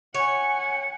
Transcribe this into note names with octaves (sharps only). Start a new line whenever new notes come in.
C#5 F#5 G#5 C#7